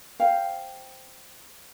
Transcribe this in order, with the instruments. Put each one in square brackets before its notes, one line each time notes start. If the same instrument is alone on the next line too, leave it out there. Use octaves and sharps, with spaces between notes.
[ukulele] C5 F5 G5